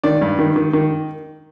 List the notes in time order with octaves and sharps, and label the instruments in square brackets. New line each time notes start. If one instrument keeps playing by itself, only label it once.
[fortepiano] D#3 D5
G2
D#3
D#3
D#3